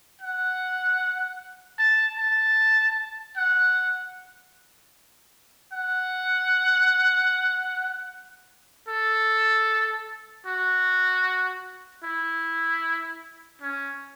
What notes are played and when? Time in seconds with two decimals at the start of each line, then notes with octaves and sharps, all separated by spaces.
0.22 F#5
1.79 A5
2.18 A5
3.37 F#5
5.73 F#5
8.88 A4
10.46 F#4
12.04 E4
13.62 C#4